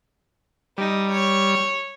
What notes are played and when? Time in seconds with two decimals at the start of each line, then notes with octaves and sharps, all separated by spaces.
0.78 G3 D#4
1.11 C#5